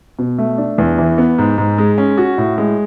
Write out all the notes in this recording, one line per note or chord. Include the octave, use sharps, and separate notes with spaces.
B2
A3
D4
E2
E3
B3
G#2
G#2
G#3
C#4
F#4
A2
G#3